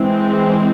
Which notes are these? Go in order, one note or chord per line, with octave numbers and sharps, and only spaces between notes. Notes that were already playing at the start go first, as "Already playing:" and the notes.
Already playing: E3 G#3 C4